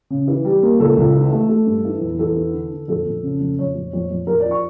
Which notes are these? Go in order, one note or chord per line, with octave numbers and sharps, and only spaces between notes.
C#3
E3
G3
A#3
C#2 A4
C#2
E3
A3
A3
G2
E3
E2
E2 A4
E3
D3
D3
F2 A4
F2
C#3
F2
F2 C#5
F2
F2
F2
F2 A#4
D5
F3
C#6